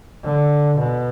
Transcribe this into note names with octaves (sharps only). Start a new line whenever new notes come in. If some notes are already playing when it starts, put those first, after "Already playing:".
D3
B2